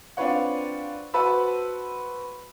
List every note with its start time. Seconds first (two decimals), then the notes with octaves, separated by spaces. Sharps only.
0.17 C4 D4 F4 B4 C#5 F#5
1.14 F#4 B4 C5 A5 B5 E6